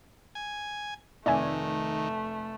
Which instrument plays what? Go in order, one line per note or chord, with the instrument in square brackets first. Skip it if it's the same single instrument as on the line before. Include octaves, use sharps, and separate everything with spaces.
[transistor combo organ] G#5
[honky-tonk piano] F1 [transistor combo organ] D#3 [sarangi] A3 [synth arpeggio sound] D5 E5 G#5